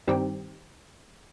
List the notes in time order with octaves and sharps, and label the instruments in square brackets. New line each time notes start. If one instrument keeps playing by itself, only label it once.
[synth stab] G2 D#3 G3 C4 G4